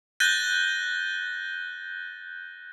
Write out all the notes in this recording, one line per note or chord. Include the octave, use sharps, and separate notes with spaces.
F#6 G6 A6 A#6 D#7 G7